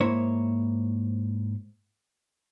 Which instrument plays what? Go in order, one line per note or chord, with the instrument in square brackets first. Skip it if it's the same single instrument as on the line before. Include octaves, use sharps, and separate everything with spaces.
[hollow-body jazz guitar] G#2 A#3 E4 C5 C#5